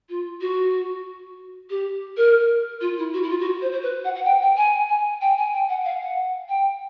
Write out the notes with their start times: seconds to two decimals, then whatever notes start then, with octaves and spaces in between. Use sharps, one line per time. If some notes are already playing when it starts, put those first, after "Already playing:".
0.09 F4
0.41 F#4
1.70 G4
2.17 A#4
2.81 F4
2.98 E4
3.14 F#4
3.23 E4
3.29 F4
3.40 F#4
3.61 C5
3.72 C5
3.82 B4
4.04 F#5
4.15 F#5
4.25 G5
4.42 G5
4.57 G#5
4.89 G#5
5.21 G5
5.38 G#5
5.52 G5
5.69 F#5
5.85 F5
6.01 F#5
6.49 G5